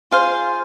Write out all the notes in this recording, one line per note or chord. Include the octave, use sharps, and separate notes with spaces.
F4 G#4 C5 F5